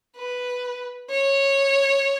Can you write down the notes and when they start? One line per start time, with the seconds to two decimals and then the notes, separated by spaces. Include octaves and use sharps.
0.17 B4
1.10 C#5